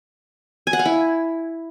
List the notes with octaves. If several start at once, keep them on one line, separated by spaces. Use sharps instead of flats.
G#5
F#5
F5
E4